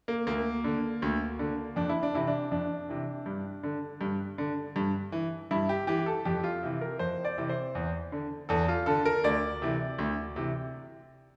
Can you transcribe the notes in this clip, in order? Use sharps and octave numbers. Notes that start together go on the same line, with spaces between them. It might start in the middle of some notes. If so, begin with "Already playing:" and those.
A#3
D2 A#3
D3
D2
D3
F2 D4
E4
D4
C3 E3 E4
D4
F2 D4
C3 E3
G2
D3
G2
D3
G2
E3
G2 E4
G4
E3 G4
A4
F2 G4
F4
C3 E3
A#4
F2 C5
D5
C3 E3
C5
E2
D3
E2 A4
F4
D3 A4
A#4
D2 D5
C3 E3
D2
C3 E3